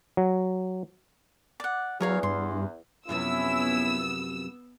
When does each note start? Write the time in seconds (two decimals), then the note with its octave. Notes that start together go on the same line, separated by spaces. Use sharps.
0.17 F#3
1.60 D5 F#5
2.00 E2 F#3 A#4 C#5 F5
2.23 G2 C6
3.09 F#2 C3 F3 B3 C#4 E4 E6